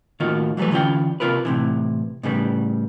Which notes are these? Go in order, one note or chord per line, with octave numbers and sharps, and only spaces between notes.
A2 D#3 A#3 F4 F#4
E3 F#3 G3 A3 B4
D3 E3 C#4 F4 G5
C3 A#3 F4 A#4 B4
A2 C3 E3
A2 C#3 G3 B3